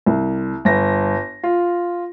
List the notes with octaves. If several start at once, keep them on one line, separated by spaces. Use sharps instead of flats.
C2
G1 A#6
F4